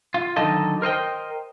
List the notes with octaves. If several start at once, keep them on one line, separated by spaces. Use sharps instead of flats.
F4
D3 D#3 F#3 D#4 A4 D#5
A#4 C5 D#5 G5